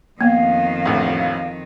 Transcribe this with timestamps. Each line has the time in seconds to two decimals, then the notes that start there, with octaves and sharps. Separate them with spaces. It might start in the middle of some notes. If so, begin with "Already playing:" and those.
0.21 F2 D#3 A#3 B3 F5
0.86 A1 D2